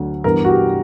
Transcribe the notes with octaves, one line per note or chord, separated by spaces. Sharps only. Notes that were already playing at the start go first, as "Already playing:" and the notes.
Already playing: D2 D3 F#3
G2 E3 B3 A#4
F#4
G4